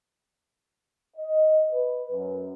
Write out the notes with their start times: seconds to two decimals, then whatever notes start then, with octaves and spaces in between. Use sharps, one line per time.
1.17 D#5
1.71 B4
2.12 F#2